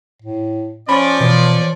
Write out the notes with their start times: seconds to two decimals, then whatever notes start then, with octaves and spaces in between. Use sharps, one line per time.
0.22 A2
0.89 F3 C#4 C#5 D5 B5
1.20 B2 E3